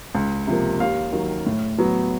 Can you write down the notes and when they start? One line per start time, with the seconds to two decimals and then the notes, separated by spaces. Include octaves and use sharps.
0.15 C#2
0.47 C3 F3 A#3
0.80 D#2 F5
1.12 D#3 F#3
1.46 A2
1.79 F#3 B3